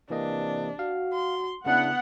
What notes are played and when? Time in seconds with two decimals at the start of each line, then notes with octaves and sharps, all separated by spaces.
0.10 C3 E3 A#3 D4 D#5
0.79 F#4 F5
1.13 C6
1.66 C#3 B3 D4 E4 F#5